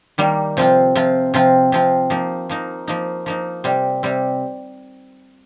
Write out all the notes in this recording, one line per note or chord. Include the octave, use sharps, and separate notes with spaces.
D#3 G3 A#3
C3 F3 C4 F4
C3 F3 C4 F4
C3 F3 C4 F4
C3 F3 C4 F4
F3 A#3 D#4
F3 A#3 D#4
F3 A#3 D#4
F3 A#3 D#4
C3 G3 C4
C3 G3 C4